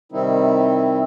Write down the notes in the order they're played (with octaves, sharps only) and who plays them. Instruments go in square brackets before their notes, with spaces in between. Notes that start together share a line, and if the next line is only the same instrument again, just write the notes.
[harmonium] C3 D#3 G3 C4 D#4 E4